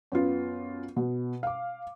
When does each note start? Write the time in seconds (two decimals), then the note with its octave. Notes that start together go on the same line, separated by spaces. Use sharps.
0.12 F#2 B3 F4
0.96 B2
1.43 F5 D6